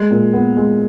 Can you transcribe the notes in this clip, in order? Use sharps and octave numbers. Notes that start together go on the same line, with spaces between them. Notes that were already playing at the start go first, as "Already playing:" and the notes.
Already playing: G#3
A#2
B3
G#3